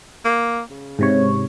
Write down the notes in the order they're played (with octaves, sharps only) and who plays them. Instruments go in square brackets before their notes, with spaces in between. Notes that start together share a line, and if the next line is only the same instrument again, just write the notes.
[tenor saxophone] A#3
C#3
[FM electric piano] G#2 C3 C#5